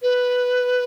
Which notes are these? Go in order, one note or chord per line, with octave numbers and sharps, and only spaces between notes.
B4